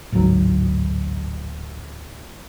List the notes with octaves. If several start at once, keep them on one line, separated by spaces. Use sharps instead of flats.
A1 D2 G#2 F#3